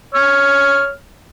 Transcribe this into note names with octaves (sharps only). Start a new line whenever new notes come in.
C#5 F6